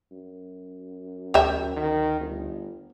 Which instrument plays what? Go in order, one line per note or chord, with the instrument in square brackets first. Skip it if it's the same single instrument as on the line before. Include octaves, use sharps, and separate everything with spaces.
[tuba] F#2
[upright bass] D2 [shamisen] G4 E5
[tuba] D#3
G1